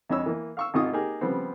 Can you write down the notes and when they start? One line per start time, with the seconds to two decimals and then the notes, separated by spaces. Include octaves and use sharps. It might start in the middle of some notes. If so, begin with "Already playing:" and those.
0.09 F2 G#3 D4 C#5 B5 E6
0.26 E3 A#3
0.57 F5 C#6 E6
0.74 G#1 C3 D#4 F4 C#6 D#6
0.92 A#3 D#4 G4 G#4 A#4
1.21 C#3 F3 G3 B3 C4